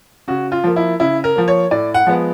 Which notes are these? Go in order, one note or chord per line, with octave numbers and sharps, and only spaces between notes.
C#3 F#4
F4
F3 A#3
E4
C#3 E4
A#4
F3 A#3
C#5
A2 D5
F#5
F3 G#3 B3